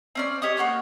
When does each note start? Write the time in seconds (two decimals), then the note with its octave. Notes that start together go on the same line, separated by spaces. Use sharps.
0.15 C4 C#4 D5
0.42 G4 C#5 D#5 D#6
0.57 A#3 F#4 C#5 G5